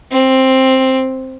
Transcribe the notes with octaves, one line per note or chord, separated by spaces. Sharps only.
C4